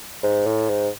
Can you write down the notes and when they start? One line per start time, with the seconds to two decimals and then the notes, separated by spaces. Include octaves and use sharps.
0.23 G#2
0.46 A2
0.69 G#2